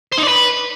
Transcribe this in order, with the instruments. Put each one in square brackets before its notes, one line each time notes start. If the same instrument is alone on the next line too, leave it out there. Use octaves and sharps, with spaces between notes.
[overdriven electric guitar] C5
D#4
D5
B4